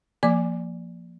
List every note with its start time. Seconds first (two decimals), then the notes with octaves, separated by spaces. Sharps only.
0.23 F3 A#3 D5 D6